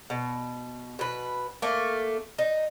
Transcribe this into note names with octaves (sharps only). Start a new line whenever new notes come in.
B2
B2 B4
A3 A#3
D#4